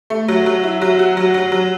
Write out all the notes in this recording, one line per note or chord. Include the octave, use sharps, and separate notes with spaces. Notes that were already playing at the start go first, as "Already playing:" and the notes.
A3
F#3
F#3
E4
F#3
F#4
F#3
F#3
F#3